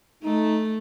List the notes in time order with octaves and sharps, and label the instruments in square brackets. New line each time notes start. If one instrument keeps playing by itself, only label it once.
[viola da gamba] A3 [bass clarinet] D#4